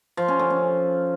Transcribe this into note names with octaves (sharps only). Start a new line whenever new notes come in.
F3
C#4
D3
C#4